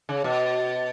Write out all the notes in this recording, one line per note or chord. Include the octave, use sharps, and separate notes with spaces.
C#3
B2